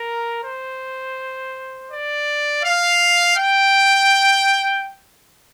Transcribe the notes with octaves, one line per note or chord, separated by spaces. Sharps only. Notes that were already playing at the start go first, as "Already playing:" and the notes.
Already playing: A#4
C5
D5
F5
G5